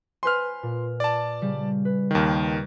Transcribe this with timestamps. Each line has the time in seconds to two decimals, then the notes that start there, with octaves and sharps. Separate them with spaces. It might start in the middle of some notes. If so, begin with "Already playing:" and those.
0.23 B4 C5 G#5 C6 F6
0.63 A#2
1.00 D5 A5
1.42 C#3 G3
1.85 B4
2.11 D#2 D#3 G5